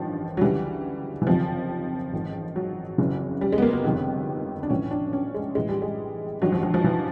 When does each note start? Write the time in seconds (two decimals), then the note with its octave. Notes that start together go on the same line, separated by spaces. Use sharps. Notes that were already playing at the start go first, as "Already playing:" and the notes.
Already playing: A1 G2 D#3 F3
0.37 F#3
0.41 D2 C#3 E3 G3
1.22 E3
1.27 F#1 F2 C3 D#3 F3
2.13 A1 G#2 D#3
2.56 F#3
2.98 F#1 F2 C#3 E3
3.41 G3
3.52 G#3
3.58 B3
3.62 A#3
3.73 B3
3.84 G1 F2 C3 D#3
4.63 D4
4.70 A#1 A2 E3 C#4
4.91 D4
5.13 C#4
5.35 G#3
5.55 A1 A2 E3 G#3
5.69 G3
5.82 G#3
6.42 A1 G2 D#3 F#3
6.52 F3
6.63 F3
6.74 F3
6.84 E3